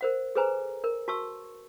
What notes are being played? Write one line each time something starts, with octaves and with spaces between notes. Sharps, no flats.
A#4 C5 F#5
G#4 A4 B4 C5 G#5 A#5
A#4
F#4 A5 C#6 E6